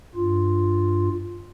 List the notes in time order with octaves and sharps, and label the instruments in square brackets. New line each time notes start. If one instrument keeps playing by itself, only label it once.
[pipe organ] G2 F4